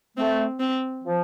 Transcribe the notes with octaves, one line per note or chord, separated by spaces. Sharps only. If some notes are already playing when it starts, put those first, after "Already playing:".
A3 C4
C4
F3